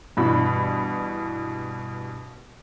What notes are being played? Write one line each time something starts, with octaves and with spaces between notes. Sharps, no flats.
G2 B2 E3 B5